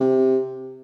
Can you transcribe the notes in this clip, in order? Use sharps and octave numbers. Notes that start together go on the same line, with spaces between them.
C3